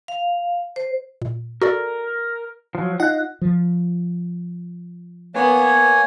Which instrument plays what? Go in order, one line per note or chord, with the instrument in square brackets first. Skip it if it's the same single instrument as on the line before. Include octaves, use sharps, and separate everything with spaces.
[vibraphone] F5
C5
[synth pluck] A#2
[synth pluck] F#4 A4 D5 [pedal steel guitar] A#4
[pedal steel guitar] F3 F#3
[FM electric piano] D#4 F4 D#5 [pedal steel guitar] F#5 F#6
[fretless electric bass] F3
[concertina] A#3 C#5 G#5 [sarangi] B3